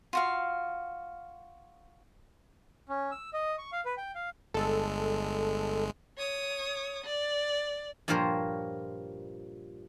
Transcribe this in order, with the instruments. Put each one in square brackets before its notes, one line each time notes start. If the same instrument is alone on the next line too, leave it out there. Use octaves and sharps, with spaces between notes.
[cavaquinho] F4 F#4 F5
[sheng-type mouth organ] C#4
E6
D#5
C#6
F5
B4
G5
F5
[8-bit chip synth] G1 G#3 [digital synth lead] A4
[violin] C#5 D#6
D5
[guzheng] G2 A#2 F3 A#4 C5 C#5